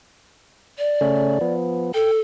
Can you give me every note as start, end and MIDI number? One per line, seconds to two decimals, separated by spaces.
0.78 1.53 74
1.01 1.39 49
1.01 1.39 57
1.01 1.39 61
1.41 1.92 53
1.41 1.92 59
1.94 2.20 69
1.94 2.11 79